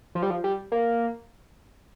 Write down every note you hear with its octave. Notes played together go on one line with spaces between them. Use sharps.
F3
G3
F3
G3
A#3